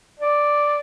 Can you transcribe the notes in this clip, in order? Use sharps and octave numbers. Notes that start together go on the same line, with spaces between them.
D5